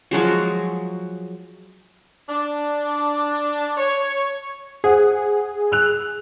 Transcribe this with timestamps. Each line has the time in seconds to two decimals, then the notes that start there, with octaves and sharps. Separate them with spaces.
0.11 F3 F#3 G#3 F#4
2.29 D4
3.77 C#5
4.84 G#4 C5 F#5
5.72 E6 F#6 F7